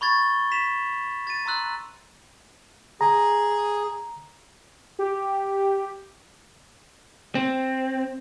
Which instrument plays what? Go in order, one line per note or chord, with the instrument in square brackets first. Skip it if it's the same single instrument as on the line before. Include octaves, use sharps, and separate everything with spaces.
[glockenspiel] B5 C#6 G#6 A6
G7
B6 E7 F7
A6 D#7
A#5 C6 E6 F#6 F#7
[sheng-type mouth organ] G#4 [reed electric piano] A#5
[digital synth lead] G4
[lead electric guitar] C4